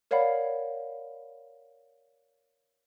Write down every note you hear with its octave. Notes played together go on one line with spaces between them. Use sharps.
A#4 C#5 D5 F5 F#5 B5